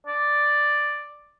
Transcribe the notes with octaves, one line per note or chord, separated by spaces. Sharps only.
D5